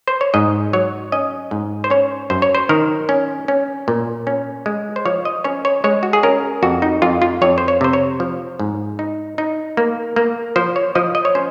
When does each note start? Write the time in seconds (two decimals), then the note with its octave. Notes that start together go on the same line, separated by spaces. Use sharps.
0.08 C5
0.21 C#5
0.34 G#2 D#5
0.73 F#3 C#5
1.12 C#4 D#5
1.51 G#2
1.84 C5
1.90 C#4 C#5
2.30 F#2 C5
2.42 C#5
2.55 C5
2.69 D#3 A#4
3.09 C#4
3.48 C#4
3.88 A#2
4.27 C#4
4.66 G#3
4.96 C5
5.05 F3 C#5
5.25 D#5
5.44 C#4 C#5
5.65 C#5
5.84 G#3 C#5
6.03 F#4
6.13 G#4
6.23 C#4 A#4
6.63 F2 F#4
6.82 D#4
7.02 F2 F4
7.22 F4
7.42 F2 C#5
7.58 C5
7.68 C#5
7.81 C3 C5
7.93 C#5
8.20 F3
8.59 G#2
8.99 D#4
9.38 D#4
9.77 A#3
10.16 A#3
10.56 F3 C5
10.76 C#5
10.95 F3 D#5
11.15 D#5
11.25 C#5
11.35 C#4 C5